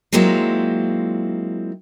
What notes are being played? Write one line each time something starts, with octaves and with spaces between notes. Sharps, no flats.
F#3 G#3 A#3 C4 E4 F4